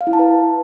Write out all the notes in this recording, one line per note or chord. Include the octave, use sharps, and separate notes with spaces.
F5
E4
A5
B4